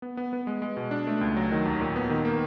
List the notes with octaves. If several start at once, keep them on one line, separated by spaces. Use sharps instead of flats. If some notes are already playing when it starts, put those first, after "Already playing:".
B3
B3
B3
G#3
G#3
B2
D4
A3
C#2
F#3
D#3
D#2
A#2
B3
D#3
A#3